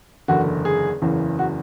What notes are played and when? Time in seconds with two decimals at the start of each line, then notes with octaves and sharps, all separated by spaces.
0.28 F#1 E2 D3 F#4
0.65 G#4
1.02 F#1 E2 C#3 E3
1.39 F#4